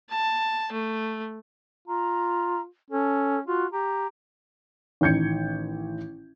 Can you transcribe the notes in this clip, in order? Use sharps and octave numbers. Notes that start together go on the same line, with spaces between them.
A5
A3
F4 A#5
C#4 A4
F4 F#4
G4 A#5
A1 D#3 G6 G#6 C#7